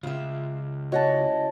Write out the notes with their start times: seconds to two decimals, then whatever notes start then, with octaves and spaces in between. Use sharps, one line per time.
0.03 C#2 C#3 F4 E5
0.92 C#4 E4 F#4 C#5 D#5 F#5 A5